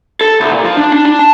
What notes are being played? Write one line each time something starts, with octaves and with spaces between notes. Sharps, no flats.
A4
C2
A#2
F3
D4
D4
D4
A5